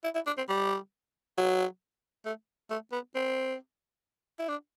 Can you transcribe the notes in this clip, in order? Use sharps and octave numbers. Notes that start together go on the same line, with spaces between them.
E4
E4
D4
C4
G3
F#3
A3
A3
B3
C4
E4
D4